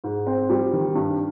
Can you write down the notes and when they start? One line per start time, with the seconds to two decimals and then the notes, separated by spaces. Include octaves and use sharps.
0.04 G#2
0.27 C4
0.50 G3
0.73 D#3
0.95 G2